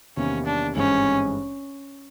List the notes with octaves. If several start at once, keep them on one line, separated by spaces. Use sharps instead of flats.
E2 C3 D#3 G3 A#3 C#4
D4
G#1 G2 E3 G#3 C4 C#4